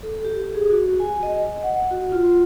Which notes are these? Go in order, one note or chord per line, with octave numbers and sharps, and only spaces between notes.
A4
G4
G#4
F#4
G#5
D#5
F#5
F#4
F4